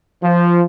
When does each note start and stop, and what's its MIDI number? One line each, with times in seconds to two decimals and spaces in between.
0.23 0.63 53